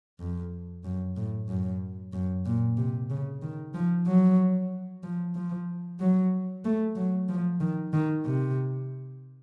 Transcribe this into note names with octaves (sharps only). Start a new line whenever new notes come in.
F2
F#2
A2
F#2
F#2
A#2
C3
C#3
D#3
F3
F#3
F3
F3
F#3
A3
F#3
F3
D#3
D#3
C3